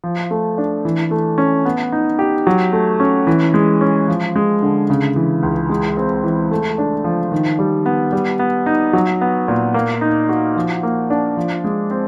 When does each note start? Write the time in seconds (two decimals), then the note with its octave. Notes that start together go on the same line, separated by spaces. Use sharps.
0.04 F3
0.31 A3
0.58 D4
0.85 E3
1.11 A3
1.38 C#4
1.65 B3
1.92 D#4
2.19 G4
2.47 F#3
2.73 A3
3.00 C#4
3.27 E3
3.54 G#3
3.81 C#4
4.08 F3
4.36 G#3
4.62 D3
4.90 C#3
5.16 E3
5.43 C#2
5.70 G#3
5.97 C4
6.24 E3
6.51 A3
6.78 D4
7.04 F3
7.32 D#3
7.59 G3
7.86 B3
8.13 G3
8.39 B3
8.66 D#4
8.93 F#3
9.21 B3
9.48 A#2
9.74 A#3
10.01 D#4
10.29 F#4
10.56 F3
10.83 A#3
11.10 D4
11.37 F3
11.64 G#3
11.91 C4